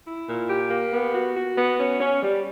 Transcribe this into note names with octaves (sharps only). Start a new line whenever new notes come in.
E4
A#2
G4
A#3
B3
F#4
F#4
B3
C#4
C#4
G3